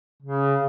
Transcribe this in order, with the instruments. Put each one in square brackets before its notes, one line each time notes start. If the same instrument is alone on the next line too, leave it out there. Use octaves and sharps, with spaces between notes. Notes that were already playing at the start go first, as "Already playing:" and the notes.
[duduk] C#3